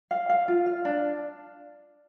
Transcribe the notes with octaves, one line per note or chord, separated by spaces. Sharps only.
F5
F5
F4
F5
D4